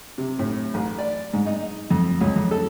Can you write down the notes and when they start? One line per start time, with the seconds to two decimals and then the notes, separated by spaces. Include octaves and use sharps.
0.18 C3
0.39 A2
0.74 A1
0.99 D5
1.33 G#2
1.46 D#4
1.91 F2
2.21 C#2
2.36 F2
2.51 A4